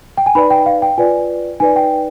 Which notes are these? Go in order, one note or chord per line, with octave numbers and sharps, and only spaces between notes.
G5
G#5
D#4 B4 D5 B5
G5
F5
G5
F4 B4 D5 G#5
D#4 B4 D5 G#5
G5